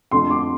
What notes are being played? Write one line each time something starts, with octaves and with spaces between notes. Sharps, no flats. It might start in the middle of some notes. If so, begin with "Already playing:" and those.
F2 D3 A3 C6
D6